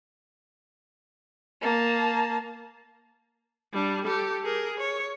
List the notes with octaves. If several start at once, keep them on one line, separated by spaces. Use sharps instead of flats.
A#3 A5
G3 D4
G4 A4
G#4 A#4
C#5